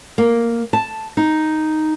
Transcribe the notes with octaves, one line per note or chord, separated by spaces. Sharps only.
A#3
A5
D#4